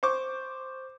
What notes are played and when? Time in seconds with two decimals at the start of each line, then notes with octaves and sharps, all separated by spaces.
0.03 C5 C#6 D6